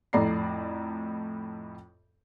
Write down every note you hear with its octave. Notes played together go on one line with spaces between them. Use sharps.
F2 A2 D5 A#5 C7